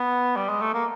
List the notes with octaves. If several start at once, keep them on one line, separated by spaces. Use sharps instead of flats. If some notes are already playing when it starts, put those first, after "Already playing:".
Already playing: B3
G3
G#3
A3
A#3